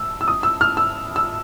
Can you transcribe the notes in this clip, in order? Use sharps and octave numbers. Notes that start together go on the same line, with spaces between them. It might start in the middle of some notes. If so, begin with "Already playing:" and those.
Already playing: E6
E6
D#6
E6
F6
E6
E6